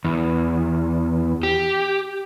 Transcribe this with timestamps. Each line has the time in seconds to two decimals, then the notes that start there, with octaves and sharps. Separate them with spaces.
0.05 E2
1.43 G4